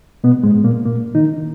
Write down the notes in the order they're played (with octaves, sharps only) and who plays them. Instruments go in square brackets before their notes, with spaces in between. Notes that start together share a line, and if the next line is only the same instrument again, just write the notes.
[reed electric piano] B2 B3
G#2 G#3
A#2 A#3
A#2 A#3
D#3 D#4